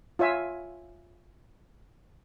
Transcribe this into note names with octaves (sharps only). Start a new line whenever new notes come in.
F4 C#5 E5 G#5